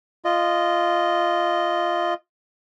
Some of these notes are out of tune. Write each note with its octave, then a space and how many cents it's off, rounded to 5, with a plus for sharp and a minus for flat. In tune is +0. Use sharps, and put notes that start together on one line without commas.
F4 -10 D#5 -10